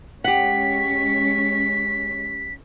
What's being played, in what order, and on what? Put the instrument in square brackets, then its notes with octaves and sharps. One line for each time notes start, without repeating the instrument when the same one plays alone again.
[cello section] G#3 C#4 [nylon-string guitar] G4 F#5 [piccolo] B6